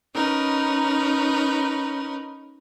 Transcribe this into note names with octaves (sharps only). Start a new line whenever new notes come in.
C#4 D#4 A#4 B4